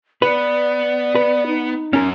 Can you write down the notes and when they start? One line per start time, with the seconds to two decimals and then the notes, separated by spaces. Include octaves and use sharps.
0.22 B3 B4 D5
1.15 B4
1.47 D#4
1.93 F#2 C#4 A#4